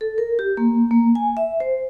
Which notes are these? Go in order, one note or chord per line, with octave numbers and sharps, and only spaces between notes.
A4
A#4
G4
A#3
A#3
G#5
E5
C5